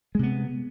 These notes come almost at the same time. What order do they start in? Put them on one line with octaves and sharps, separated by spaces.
G#3 C3 B3